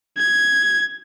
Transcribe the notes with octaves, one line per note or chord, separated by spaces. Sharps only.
G#6